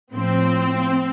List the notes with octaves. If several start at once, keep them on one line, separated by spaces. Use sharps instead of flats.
A2 F3 C4